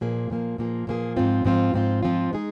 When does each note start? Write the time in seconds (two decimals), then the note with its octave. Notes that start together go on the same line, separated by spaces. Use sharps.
0.01 A#2 F3 A#3 G#4
0.30 A#2 F3 A#3 G#4
0.58 A#2 F3 A#3 G#4
0.87 A#2 F3 A#3 G#4
1.16 G#2 F3 C4 F4
1.45 G#2 F3 C4 F4
1.74 G#2 F3 C4 F4
2.03 G#2 F3 C4 F4
2.33 G#3 D#4 G#4